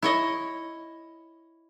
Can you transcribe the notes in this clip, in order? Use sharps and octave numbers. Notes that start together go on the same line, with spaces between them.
E4 C#5 D#5